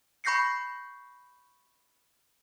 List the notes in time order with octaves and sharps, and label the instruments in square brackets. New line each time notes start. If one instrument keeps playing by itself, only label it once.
[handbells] B5 C#6 G6 A#6 C7 C#7